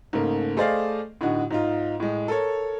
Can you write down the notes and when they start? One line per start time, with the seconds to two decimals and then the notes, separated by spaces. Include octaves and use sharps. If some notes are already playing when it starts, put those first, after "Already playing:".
0.13 G#2 C#3 A3 A#3
0.57 A3 G#4 C5 D5 D#5 F5
1.21 A2 D3 D#4 F#4
1.51 G#2 D#4 F4
2.00 A2 G#3
2.28 A4 A#4 C#5